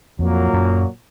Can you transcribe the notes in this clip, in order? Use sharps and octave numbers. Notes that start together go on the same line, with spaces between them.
F2 A#2 F#3 A#3
F#2